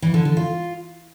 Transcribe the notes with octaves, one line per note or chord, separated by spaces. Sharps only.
E3
D3
D3
F4